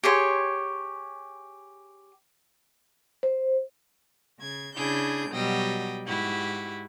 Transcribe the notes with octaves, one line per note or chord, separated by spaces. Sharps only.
G4 G#4 C#5 C6
C5
C#3 G#6
C#3 D4 E4 G#4 G6
B2 F#3 G3 D#5 G5
G#2 E4 F#4 G4